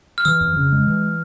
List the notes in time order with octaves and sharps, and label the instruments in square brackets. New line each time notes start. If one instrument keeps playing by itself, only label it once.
[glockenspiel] F6
[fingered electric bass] E3 [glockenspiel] E6
[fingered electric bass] F2
C#3
G#3
E3